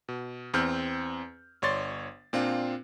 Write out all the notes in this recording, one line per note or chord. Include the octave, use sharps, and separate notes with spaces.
B2
E2 C4 E6 F6 G6
G1 C#5 D5 C6 A6
A#2 C4 D4 F4